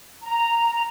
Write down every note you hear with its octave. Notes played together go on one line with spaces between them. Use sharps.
A#5